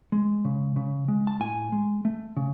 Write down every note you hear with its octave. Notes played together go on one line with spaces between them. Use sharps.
G#3
C#3
C#3
G#3
A5
A2 G#5
G#3
A3
C#3